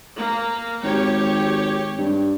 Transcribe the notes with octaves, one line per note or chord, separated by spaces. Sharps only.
A#3
G#1 G4 C#5
G2